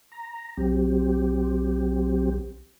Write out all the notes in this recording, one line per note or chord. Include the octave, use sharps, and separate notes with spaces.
A#5
B1 F#3 C4 G4